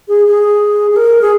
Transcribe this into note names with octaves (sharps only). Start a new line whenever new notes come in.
G#4
G#4
G#4
A#4
G#4